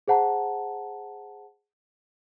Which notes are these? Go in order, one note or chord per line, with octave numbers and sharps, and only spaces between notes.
G#4 C5 F#5 A5 A#5